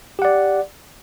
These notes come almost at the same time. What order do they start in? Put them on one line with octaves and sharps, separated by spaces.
G4 F#5 D5